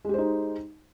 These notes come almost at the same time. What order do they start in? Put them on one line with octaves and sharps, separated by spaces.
G#3 G4 C5 D#4